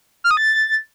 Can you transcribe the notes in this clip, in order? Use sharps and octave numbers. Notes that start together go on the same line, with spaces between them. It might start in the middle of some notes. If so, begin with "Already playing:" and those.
F6
D#6
A6